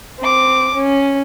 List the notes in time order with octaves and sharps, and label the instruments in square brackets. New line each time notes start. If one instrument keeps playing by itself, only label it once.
[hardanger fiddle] C4 D6
C#4